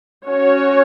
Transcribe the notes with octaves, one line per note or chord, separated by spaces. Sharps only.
C#4 F#4 C#5